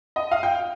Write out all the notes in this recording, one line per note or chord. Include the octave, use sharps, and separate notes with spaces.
D#5
F5
G5